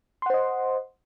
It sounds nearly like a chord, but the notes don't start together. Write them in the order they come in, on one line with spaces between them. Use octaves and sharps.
C6 F#5 C5 D#5